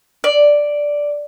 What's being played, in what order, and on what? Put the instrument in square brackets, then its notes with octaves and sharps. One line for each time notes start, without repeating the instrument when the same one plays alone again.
[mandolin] D5